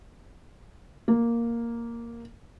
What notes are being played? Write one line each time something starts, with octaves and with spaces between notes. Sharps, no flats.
A#3